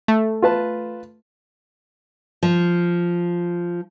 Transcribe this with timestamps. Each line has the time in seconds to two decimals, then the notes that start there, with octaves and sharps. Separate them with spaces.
0.08 A3
0.42 F4 B4 A5
2.43 F3